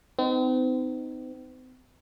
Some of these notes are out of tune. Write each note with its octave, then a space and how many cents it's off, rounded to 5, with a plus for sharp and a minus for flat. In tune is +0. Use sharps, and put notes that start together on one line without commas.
C4 -40 D#4 +0